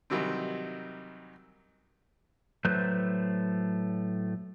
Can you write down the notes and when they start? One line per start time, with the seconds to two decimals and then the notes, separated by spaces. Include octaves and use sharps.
0.10 C3 D#3 E3 F#3 G3 C4
2.65 A2 F#3 A3 B4 C5